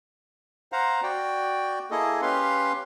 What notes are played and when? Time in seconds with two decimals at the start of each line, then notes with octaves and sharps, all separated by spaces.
0.72 C5 F5 F#5 A#5
1.03 F#4 D5 G5
1.91 A#3 E4 G#4 A4 D#5
2.22 C#4 G4 B4 F5 C6